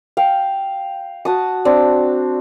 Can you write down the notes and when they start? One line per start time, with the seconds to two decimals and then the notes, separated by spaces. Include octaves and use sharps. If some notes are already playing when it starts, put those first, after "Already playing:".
0.17 F5 G5
1.25 F#4 A5 D#6
1.65 C4 D4